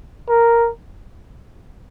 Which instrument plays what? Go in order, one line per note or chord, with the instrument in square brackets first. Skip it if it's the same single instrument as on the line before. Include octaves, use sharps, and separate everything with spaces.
[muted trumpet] A#4